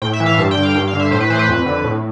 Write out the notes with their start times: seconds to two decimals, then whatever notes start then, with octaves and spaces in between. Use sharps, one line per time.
0.02 A2 G5
0.13 E5
0.20 E3
0.26 F5
0.38 G2 A5
0.51 G5
0.57 D3
0.63 F5
0.74 G2 G5
0.88 F5
0.93 D3
0.99 E5
1.11 A2 C5
1.20 B4
1.30 E3 C5
1.39 B4
1.49 F2
1.66 D3
1.84 A2